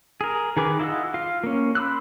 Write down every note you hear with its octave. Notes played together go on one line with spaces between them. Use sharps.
G#4 A#4
D#3 G#4 B4 D6
E4 F4 D#5 F#5 E6
F4 F5
A#3 C#4
B5 C6 D6 E6 F#6